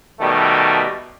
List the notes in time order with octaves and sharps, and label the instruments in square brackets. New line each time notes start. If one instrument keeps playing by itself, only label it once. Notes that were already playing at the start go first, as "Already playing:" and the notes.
[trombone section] B2 D#3 G3 A3